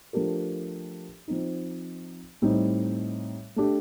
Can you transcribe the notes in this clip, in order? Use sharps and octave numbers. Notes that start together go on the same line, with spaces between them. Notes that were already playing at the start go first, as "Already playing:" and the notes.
F3 A3 D4 G4 A#4
F3 C4 D#4
A2 G3 C4 D#4
A3 D4 G4